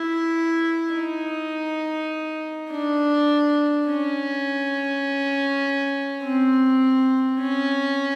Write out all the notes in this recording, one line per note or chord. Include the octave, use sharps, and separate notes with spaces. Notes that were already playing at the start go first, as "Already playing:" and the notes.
Already playing: E4
D#4
D4
C#4
C4
C#4